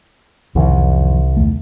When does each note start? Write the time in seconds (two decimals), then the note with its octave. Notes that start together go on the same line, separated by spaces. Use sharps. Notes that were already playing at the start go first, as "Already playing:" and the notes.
0.55 C2 F2 D#3 E3
1.37 E2 D#3 A3